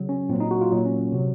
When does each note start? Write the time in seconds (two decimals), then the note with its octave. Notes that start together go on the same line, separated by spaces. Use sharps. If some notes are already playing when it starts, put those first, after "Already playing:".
Already playing: C#3 F#3
0.09 C#4
0.29 A#2 C4
0.33 F#3
0.40 D#4
0.51 F#4
0.61 F4
0.72 A#2 F#3 D#4
0.85 C#4
1.12 C3 F#3